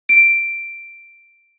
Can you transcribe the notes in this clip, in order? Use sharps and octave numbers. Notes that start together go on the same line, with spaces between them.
D7